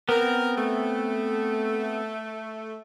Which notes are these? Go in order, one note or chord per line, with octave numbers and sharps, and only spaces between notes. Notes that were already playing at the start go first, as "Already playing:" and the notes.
B3 C4 A#4
A3